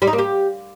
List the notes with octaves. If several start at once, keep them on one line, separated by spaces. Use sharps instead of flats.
G3
D#4
A#3
G4